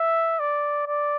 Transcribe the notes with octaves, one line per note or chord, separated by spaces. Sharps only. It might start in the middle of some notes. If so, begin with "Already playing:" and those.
Already playing: E5
D5
D5